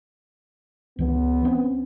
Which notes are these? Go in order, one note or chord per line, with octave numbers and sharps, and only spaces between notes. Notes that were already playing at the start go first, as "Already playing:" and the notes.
C#2 E3 B3
C4 C#4